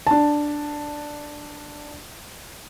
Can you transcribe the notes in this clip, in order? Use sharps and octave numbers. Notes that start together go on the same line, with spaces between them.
D4 A5